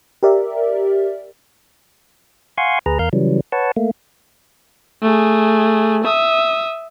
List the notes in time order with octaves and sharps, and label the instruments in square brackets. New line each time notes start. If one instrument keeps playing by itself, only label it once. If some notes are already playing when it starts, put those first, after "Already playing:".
[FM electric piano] G4 A#4 D5 E5
[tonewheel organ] F5 F#5 G#5 C6 C#6
D2 G#4 B4 A#5
E2 A#4 F5 F6 G6
C#3 E3 F#3 G3
B4 C#5 F#5 A5
A3 A#3
[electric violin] A3 G#4
E5 D#6